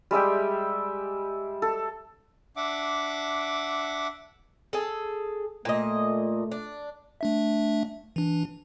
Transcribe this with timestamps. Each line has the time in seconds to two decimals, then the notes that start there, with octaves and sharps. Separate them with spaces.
0.11 G3 G#3 E5 G5
1.62 A4
2.57 D4 E5 F#5 D6
4.73 G#4 A4
5.65 A#2 A3 D#5
6.51 D4
7.21 A3 D4 E5
8.16 E3 D4